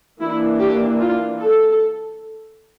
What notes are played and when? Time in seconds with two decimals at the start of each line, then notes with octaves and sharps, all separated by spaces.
0.20 E3 A#3 D4 E4
0.59 G4
0.99 F4
1.39 A4